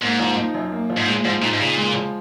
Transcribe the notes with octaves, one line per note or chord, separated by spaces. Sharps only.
G#2 A#3
F3
D#4
F#2
A#3
F3
G#2
A#2 G#3
G#2 F3
A#2 D#4
G#2
A#2 C#3
G#3
F3